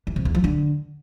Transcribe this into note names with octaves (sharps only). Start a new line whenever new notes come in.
E3
C3
E2
F3
D3